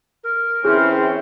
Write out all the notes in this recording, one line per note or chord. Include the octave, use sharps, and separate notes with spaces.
A#4
E3 C4 C#4 E4 G#4